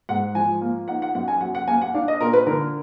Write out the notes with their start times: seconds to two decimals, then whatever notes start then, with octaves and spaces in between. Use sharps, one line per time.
0.09 G#2 F#5
0.35 F3 G#5
0.61 A#3
0.88 D#4 F#5
1.02 F#5
1.15 F#2 F#5
1.28 G#5
1.41 F#3 F#5
1.55 F#5
1.68 A#3 G#5
1.82 F#5
1.94 D4 F5
2.08 D#5
2.20 A#2 A#4
2.33 B4
2.47 D3 A#4